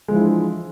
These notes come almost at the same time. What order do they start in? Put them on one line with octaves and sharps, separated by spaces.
G#3 F3 E3 E4 D4